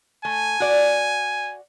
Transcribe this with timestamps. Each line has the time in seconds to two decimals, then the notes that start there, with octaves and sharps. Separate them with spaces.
0.25 A3 G#5
0.60 F#4 D5